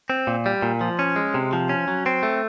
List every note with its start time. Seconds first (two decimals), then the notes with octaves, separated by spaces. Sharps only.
0.10 C4
0.27 A#2
0.46 G3
0.62 A#2
0.81 F3
0.99 C#4
1.16 G#3
1.34 C3
1.53 F3
1.69 C#4
1.88 F#3
2.06 C4
2.23 A3